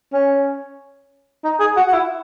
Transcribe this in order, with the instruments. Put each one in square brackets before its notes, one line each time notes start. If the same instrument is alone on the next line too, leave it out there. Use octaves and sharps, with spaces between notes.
[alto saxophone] C#4
D#4
G#4
F#4
F#4
E4